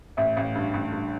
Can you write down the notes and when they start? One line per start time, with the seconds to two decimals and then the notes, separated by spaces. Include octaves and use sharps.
0.17 A1 E5
0.37 A1 F5
0.55 G2
0.74 A1
0.93 G2